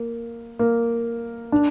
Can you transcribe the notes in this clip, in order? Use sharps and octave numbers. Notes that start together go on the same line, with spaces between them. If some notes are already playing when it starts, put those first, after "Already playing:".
Already playing: A#3
A#3
D4